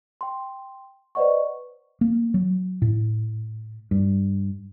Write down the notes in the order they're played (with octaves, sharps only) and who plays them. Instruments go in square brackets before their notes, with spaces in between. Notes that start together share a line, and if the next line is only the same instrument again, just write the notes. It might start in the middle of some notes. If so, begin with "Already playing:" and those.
[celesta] G5 C6
B4 C5 D5 D#5 F#5 C#6
[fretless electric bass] A#3
F#3
A2
G2